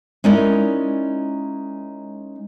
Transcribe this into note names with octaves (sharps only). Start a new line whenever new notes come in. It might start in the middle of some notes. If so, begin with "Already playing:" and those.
G#3 C#4 D#4 E4 A#4 D5